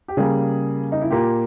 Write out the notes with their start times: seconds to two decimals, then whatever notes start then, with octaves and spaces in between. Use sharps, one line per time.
0.08 G4
0.17 C#3 G3 A#3 G#4
0.92 D#4
1.02 E4
1.10 A#2 A#3 G4